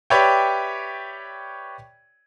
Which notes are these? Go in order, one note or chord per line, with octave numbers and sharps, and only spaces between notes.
G4 B4 C#5 D5 E5 G5